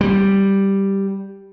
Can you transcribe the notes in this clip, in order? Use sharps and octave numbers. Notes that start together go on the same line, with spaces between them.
G3